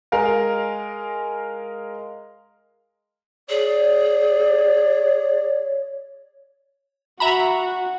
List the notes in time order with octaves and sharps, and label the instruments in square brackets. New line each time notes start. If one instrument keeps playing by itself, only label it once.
[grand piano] G#3 A#4 F5 G#5
[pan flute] G#4 [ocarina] C#5 [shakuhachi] D5
[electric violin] F#4 [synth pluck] E5 A#5 B5